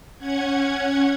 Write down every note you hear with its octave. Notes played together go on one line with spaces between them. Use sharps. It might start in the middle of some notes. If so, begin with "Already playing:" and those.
C#4 F#5 G#6